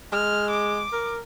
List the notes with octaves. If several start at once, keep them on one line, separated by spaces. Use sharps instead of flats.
G#3 F6
D6
A#4